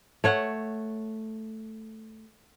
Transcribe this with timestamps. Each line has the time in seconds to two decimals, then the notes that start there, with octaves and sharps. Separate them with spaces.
0.24 A3 C#5 F#5